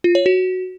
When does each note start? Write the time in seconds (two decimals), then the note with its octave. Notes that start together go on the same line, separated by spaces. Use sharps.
0.04 F4
0.15 C#5
0.26 F#4